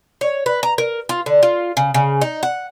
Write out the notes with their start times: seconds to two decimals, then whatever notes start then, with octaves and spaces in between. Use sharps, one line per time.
0.21 C#5
0.46 B4
0.63 A#5
0.78 A#4
1.09 F4
1.26 D3
1.43 F4
1.77 C#3
1.94 C#3
2.21 D#4
2.43 F#5